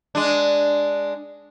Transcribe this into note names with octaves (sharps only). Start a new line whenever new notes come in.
G#3 D4